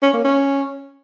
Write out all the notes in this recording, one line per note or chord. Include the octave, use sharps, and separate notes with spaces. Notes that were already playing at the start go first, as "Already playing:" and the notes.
C#4
A#3
C#4